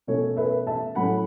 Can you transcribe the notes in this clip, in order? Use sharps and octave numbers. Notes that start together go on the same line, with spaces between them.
B2 A3 C#4 C#5
B4 E5
E5 A5
A2 F#3 A3 C#4 F#5 B5